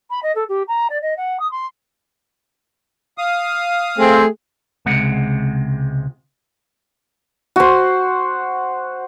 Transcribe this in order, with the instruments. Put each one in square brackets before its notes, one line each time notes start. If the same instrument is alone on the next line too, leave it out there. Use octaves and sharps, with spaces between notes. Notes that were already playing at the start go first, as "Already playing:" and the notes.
[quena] B5
D#5
A4
G4
A#5
D5
D#5
F#5
D#6
C6
[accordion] F5 D#6
[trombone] A3 [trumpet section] C4 [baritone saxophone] G#4
[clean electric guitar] C#2 C3 G#3 F#5
[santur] F#4 C5